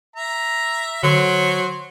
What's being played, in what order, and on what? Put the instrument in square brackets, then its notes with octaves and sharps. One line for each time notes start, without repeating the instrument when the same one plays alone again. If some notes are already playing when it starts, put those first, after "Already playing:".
[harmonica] E5 A#5
[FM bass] D3 [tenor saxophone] F#3 [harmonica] C5